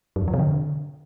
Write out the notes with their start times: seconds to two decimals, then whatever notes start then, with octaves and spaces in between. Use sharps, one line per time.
0.16 F#2
0.22 F2
0.28 F3
0.34 C3
0.39 D3